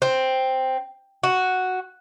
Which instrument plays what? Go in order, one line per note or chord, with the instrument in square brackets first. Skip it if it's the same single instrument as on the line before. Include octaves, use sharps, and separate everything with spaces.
[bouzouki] C4
F#4